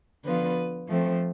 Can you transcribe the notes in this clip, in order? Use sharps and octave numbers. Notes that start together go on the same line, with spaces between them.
D3 F3 B3 F4 B4
F3 A3 C4